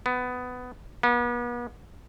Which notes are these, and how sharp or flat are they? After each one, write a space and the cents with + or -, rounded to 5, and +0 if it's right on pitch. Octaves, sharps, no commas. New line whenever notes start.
B3 +15
B3 -40